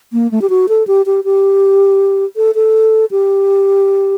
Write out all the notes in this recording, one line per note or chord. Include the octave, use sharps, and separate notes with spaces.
A#3
A3
G4
F#4
A4
G4
G4
G4
A4
A4
G4